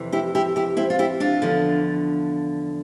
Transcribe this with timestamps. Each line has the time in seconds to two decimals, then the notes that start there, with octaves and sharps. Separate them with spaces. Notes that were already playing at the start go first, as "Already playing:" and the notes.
Already playing: F2 C3 E3
0.13 E4 G4
0.35 E4 G4
0.56 E4 G4
0.77 C4 E4
0.90 F4
0.99 E4 G4
1.20 D4 F4
1.42 E2 D3 F3